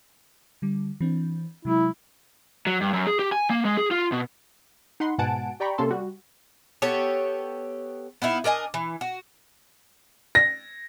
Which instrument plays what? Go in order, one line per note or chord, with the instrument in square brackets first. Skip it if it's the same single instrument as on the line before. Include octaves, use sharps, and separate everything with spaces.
[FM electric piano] D3 G3
E3 C4 D4
[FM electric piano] C3 F#3 G#3 [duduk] E4
[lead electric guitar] F#3
G2
F#2
G#4
G4
G#5
A#3
G#3
G#4
F4
B2
[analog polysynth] D#4 F#5 B5 C6
G#2 B2 F#5 G#5 A5 D7
G4 D5 G5 A#5 B5 C#6
C3 A#3 C#4 A4 C6
G3 F#4
[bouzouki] B3 G4 A4 C#5
B3 D#4 E4 F5
D4 A#4 D#5 G#5
E3
F#4
[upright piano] A#6